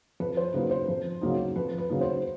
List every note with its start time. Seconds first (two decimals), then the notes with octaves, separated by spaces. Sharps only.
0.20 F2 B4
0.37 C5
0.54 C#3 F#3 A#3 D#4 B4
0.71 C5
0.88 F2
1.21 C#3 F#3 A#3 D#4
1.56 F2 B4
1.78 B4
1.89 C#3 F#3 A#3 D#4
2.01 C5